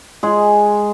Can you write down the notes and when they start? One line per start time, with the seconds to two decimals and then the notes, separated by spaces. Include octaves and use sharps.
0.23 G#3 G#4